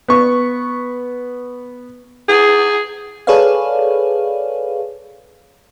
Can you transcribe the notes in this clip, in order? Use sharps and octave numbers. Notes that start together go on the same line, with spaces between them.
B3 C#6
G#4
G#4 A4 B4 C#5 D5 F5